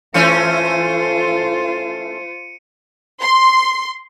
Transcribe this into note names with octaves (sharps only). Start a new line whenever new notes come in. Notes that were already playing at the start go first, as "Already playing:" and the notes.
E3 A3 C#4 F4 C5 C#7 D#7
C6